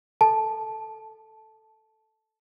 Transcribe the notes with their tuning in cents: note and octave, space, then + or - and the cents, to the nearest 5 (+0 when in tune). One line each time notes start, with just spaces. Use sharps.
A4 +0 A5 -10